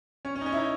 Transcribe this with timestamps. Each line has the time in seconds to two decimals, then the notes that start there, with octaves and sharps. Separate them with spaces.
0.25 C#4
0.36 C#4
0.41 D#4
0.46 C#4
0.52 E4
0.57 D#4